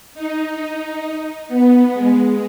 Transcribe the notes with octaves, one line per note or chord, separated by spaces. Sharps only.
D#4
B3
G#3